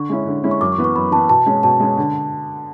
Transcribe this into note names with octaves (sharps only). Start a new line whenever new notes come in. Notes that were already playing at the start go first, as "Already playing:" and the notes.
Already playing: D3 C#6
G#3 C#4 E4
D3
G#3 C#4 E4
C#6
F#2 D6
C#6
E3 B3
C#6
F#2 B5
E3 B3 A5
B2 A5
G#3 C#4
B2 A5
G#3 C#4
D3